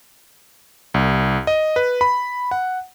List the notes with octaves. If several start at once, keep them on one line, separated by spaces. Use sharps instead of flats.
C2
D#5
B4
B5
F#5